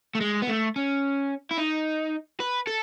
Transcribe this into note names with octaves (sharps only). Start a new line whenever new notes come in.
A3
G#3
B3
A3
C#4
E4
D#4
B4
A4